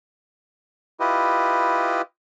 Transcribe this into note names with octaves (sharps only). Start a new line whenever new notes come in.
E4 F4 G4 B4 D#5